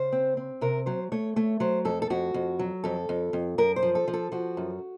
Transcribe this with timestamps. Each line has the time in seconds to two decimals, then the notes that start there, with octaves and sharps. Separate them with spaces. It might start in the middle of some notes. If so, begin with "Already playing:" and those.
Already playing: C#3 C5
0.12 C4
0.37 C4
0.61 C3 A#4
0.86 F#3 C5
1.12 A3 C#5
1.36 A3 C#5
1.60 F#3 C5
1.85 F2 A4
2.02 A4
2.10 F2 F#4
2.34 F2
2.59 F#3
2.84 F2 A4
3.09 F2
3.33 F2
3.58 F#2 A#4
3.76 C5
3.83 F3
3.95 A4
4.08 F3
4.14 A4
4.32 F3 F#4
4.57 F#2